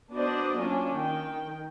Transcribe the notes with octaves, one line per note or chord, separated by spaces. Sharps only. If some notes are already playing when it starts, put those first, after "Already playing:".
B3 D4 F#4 C5 D5 D#5
F#3 A#3 C#4 D4 F4
D#3 G5